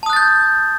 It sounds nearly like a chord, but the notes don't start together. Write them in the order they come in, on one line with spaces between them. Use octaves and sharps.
A5 D#6 F#6 A6 G6